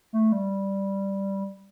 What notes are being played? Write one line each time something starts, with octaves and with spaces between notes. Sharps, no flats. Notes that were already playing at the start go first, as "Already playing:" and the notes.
A3
G3